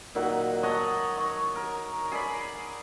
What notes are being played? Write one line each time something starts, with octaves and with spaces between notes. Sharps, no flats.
A#2 D#3 F#3 F#5
C#5 D#5 F#5 A5
C#5 C#6
A#4
G#4 A#4 D5 B5